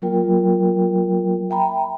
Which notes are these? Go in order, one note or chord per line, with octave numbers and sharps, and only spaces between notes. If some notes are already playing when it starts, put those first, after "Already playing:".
F#3 A#3 F4 A#4 G5
E5 G5 A#5 B5